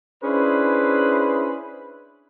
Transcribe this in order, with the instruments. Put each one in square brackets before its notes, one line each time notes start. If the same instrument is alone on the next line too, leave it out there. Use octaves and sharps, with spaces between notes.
[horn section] C#4 D4 E4 G#4 B4 C5